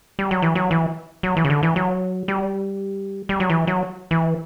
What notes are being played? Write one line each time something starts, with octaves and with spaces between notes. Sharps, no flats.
G3
F#3
E3
F#3
E3
F#3
E3
C#3
D3
E3
F#3
G3
G3
F#3
E3
F#3
E3